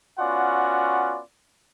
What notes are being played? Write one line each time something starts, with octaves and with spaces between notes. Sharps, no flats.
B3 C#4 F4 F#4 D5 F#5